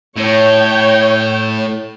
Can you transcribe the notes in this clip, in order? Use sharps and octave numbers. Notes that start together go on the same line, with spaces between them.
A2 C#5 G5